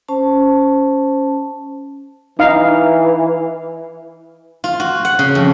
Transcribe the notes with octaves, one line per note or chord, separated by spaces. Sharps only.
C#4 C5 A5
E3 D#4 F5
F4
F#4
F#5
C#3
F2